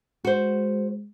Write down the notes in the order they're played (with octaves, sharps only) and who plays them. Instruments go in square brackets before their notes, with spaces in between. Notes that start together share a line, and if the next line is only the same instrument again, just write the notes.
[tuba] G#3 [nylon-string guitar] F#4 C5